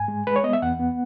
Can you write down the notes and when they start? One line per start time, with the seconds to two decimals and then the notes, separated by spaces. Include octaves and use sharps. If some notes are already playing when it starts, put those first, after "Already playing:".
Already playing: G#2 G#5
0.08 G#3
0.27 G#3 B4
0.36 C#5
0.44 B3 D#5
0.53 E5
0.62 E2 F#5
0.80 B3